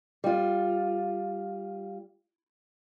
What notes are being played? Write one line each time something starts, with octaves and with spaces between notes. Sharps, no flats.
G3 F4